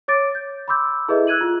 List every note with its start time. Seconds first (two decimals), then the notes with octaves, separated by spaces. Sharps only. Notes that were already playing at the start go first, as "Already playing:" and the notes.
0.08 C#5 D6 A6 D7
0.35 G6
0.68 B5 C6 D6 E6 G6
1.08 E4 G#4 A4 B4 D#5 E5
1.27 E6 F#6 G#6 D#7 F#7
1.41 F4